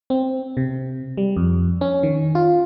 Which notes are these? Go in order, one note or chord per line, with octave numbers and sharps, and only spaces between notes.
C4
C3
G3
F2
C#4
D#3
F4